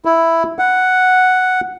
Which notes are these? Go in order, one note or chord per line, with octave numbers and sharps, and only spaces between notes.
E4
F#5